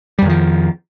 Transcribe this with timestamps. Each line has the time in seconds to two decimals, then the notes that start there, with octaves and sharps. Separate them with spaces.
0.19 G3
0.22 F2
0.26 D#3
0.29 F3